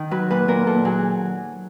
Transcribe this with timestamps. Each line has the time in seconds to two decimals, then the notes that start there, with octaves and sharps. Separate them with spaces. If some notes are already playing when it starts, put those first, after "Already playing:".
Already playing: D#3
0.11 F#3 B4
0.30 A#2 B4
0.48 A#2 A#4
0.67 A#2 A4
0.85 F#3 G#4